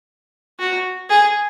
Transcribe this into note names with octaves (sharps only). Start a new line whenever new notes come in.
F#4
G#4